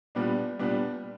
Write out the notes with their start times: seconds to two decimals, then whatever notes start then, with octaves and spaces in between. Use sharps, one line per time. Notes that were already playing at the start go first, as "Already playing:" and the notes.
0.15 A#2 G3 B3 D4
0.59 A#2 G3 B3 D4